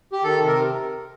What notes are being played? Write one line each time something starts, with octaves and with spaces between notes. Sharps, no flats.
G4
D#3 A4
C3
A#4